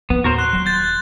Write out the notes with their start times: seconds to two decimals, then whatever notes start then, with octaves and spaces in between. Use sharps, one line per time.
0.10 C2 F3 B3
0.24 D#2 A2 F#4 A#4 C5
0.38 C6 F#6
0.53 D#1 F#3
0.66 G6 A6